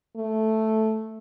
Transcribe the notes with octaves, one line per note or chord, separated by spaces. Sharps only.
A3